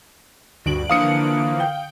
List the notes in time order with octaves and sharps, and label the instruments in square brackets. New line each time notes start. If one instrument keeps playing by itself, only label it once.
[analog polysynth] D2 G2 [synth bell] D3 D7 F#7 [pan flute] F#4
[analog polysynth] E3 F3 A#3 [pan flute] D4 [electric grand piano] F5 D#6 C#7
[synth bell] G5